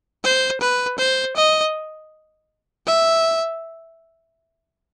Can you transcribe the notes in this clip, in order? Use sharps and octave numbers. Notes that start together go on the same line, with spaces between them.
C5
B4
C5
D#5
E5